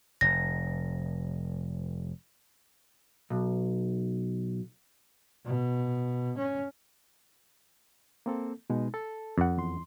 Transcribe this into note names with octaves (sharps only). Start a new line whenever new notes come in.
F1 A#6
B1
B2
C#4
A#3 C4 A4
B2 G#3 D#4
A4 A5
F2 F#5
E2 C6